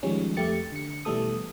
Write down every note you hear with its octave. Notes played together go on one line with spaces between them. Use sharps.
D#3 F3 G3 G#3 C#4
F2 A3 G4 A6 C#7
D3 C#7
B2 E3 G3 A3 A4 D#6